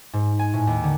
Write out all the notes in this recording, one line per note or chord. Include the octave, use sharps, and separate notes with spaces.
G#2
G#5
A2
D#2
D3